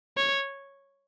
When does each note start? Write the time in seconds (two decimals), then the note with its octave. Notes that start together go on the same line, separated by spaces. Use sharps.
0.17 C#5